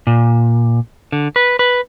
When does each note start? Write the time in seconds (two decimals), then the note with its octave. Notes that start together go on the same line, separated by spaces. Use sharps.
0.07 A#2
1.12 D3
1.36 B4
1.59 B4